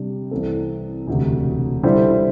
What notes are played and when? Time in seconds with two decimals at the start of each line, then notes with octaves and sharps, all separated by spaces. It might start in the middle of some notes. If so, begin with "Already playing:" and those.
Already playing: C3 G3 D4
0.31 C2 C3 E3 C4 A4
1.07 E1 D2 C3
1.83 D3 G3 E4 C5